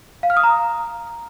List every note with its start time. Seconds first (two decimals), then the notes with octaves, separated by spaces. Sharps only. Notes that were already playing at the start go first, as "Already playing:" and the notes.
0.23 F5
0.30 F6
0.37 D#6
0.43 A#5